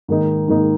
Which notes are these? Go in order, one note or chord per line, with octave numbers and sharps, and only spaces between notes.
G#2 D#3 A#3 D#4
G#2 D#3 A#3 D#4